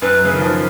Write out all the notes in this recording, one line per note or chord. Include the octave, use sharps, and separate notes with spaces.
F#2 B4
C#3
D#3
F3